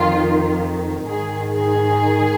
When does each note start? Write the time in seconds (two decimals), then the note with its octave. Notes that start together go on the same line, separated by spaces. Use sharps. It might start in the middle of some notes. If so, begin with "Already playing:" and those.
Already playing: F2 D#3 F4
1.07 G#2 D#3 G#4
1.52 G#4